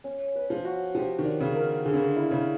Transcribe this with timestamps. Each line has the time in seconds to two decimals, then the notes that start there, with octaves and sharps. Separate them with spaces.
0.04 C#4
0.36 B4
0.50 F3
0.65 F#4
0.95 F3 G4
1.19 D#3
1.25 D5
1.41 C#3
1.55 A#4
1.85 D3 G#4
1.94 C#3
2.02 D3
2.16 E4
2.31 C#3